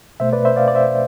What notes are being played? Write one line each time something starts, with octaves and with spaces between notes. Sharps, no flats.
B2 A3 C5 E5
B4 D5
C5 E5
D5 F5
D5
C5 E5